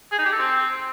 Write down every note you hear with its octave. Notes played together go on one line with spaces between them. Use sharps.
G#4
D#4
G4
A4
C4